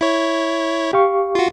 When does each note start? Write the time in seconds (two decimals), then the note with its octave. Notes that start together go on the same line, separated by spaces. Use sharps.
0.01 E4 C#5
0.93 G4 F5 C#6
1.35 F4 F#4